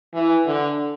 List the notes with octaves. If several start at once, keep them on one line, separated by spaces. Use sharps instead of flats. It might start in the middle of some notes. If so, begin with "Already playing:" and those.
E3
D3